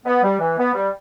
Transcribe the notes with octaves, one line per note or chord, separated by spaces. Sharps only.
B3
G3
E3
B3
G3